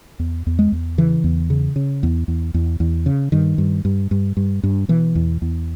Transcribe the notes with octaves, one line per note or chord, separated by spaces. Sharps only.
E2
E2
G#3
E2
C#3 E3
E2
C#3
C#3
E2
E2
E2
E2
C#3
G2 D#3
G2
G2
G2
G2
G2
B2 E3
E2
E2